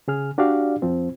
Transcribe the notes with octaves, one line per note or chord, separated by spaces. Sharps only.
C#3 G#4 F6
D4 F#4 G4 D5 F5
F2 F3 C4